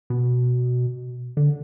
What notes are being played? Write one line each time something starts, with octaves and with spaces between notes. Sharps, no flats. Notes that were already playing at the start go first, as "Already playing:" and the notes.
B2
D3